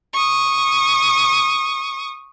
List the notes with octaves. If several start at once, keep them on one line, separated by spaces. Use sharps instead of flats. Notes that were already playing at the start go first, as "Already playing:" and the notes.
C#6 D#6